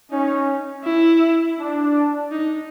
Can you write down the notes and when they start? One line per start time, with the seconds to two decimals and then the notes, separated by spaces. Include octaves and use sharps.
0.11 C#4 D#4
0.84 E4
1.59 D4
2.32 D#4